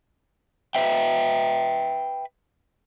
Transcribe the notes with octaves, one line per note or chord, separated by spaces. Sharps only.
B4 E5 G5